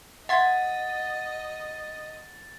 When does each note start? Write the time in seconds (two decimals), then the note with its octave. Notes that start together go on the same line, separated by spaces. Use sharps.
0.29 D#5 E5 F#5 C6 G#6 A6